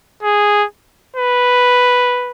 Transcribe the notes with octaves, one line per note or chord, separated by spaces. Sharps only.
G#4
B4